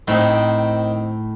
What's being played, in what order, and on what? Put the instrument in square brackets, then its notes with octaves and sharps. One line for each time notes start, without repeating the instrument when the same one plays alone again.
[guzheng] A2 [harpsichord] D#3 C4 D#4